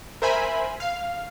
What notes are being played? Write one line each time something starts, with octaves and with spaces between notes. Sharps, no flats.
A#4 C5 E5 G#5 B5
F5